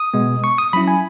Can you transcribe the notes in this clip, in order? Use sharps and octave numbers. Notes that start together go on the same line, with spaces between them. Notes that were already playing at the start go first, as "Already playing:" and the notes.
Already playing: D#6
B2 G#3 B3
C#6
D#6
F#3 C#4 E4 B5
G#5